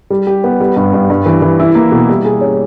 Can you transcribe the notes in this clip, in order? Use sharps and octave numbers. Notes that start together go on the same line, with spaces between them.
G3
G4
B3
G3
G2
G2
G2
E3
E3
E4
A#3
B2
G3
G#4
C#4